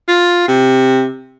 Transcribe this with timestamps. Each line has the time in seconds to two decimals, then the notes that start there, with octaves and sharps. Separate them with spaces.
0.08 F4
0.48 C3